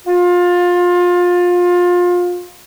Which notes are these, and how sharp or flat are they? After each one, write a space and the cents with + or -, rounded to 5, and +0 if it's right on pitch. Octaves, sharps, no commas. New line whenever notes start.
F4 +25